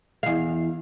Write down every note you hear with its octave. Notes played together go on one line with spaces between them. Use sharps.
E2 F5